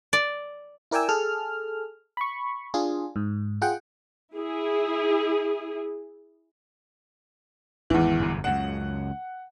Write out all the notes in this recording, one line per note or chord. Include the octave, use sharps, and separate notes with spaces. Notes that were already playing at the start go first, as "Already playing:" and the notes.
D5
E4 A#4 D5 G5 G#5 E6
G#4 A4 F6
B5 C#6
D4 F4 G#4
G#2
F4 G#4 F#5 G5
E4 G#4
G#1 E2 E3
G1 F#2 B2
C#2 F#2 C#3 F#5